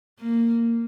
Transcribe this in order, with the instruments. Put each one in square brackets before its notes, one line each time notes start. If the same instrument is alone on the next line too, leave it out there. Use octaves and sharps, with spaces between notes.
[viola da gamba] A#3